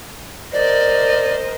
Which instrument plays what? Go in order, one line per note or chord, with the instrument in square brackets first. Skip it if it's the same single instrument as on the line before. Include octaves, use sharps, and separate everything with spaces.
[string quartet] A#4 C5 D#5 [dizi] D5